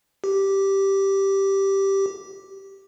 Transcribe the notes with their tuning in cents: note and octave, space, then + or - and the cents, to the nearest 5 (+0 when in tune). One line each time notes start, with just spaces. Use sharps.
G4 -5